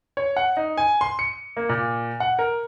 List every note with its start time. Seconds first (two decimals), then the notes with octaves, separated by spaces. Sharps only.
0.17 C#5
0.37 F#5
0.57 D#4
0.77 G#5
1.01 C6
1.19 C#7
1.57 A#3
1.69 A#2
2.20 F#5
2.39 A#4